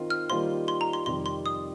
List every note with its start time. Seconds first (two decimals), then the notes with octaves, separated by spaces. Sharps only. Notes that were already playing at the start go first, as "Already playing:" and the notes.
Already playing: D#3 C4 F4 A#4
0.10 F6
0.30 D#3 G3 A#3 F4 C5 C6
0.68 C6
0.81 A#5
0.93 C6
1.06 F2 C3 D#3 G3 C6
1.26 C6
1.46 D#6